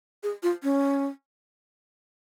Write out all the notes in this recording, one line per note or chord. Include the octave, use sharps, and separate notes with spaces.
G#4
F4
C#4